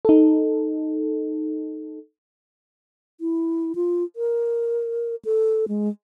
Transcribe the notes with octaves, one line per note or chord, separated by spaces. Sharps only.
D#4 A4
E4
F4
A#4
A4
G#3